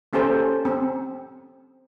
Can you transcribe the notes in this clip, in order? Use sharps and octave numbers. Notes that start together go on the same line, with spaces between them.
A#3 C#4 G4 A4 C5 A#5
C4